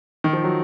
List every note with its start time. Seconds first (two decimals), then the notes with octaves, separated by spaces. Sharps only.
0.24 D#3
0.33 F3
0.44 F#3